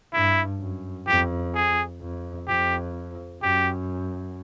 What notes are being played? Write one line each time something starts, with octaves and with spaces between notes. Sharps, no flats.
G2 E4
F#2
F2 G4
G#4
F2
F2 G4
F#2 G4